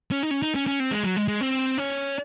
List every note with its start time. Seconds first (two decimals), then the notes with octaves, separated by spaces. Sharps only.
0.12 C#4
0.23 D#4
0.31 C#4
0.42 D#4
0.55 C#4
0.67 C#4
0.80 C4
0.91 G#3
1.04 F#3
1.16 G#3
1.28 G#3
1.41 C4
1.78 C#4